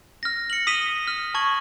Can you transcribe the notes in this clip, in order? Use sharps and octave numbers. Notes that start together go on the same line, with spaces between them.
F6 A#6
C#7 F#7
D#6 B6 D#7 F7 G7
F6
A5 C#6 G#6 F#7